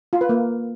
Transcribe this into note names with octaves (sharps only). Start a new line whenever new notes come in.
F4
B4
A#3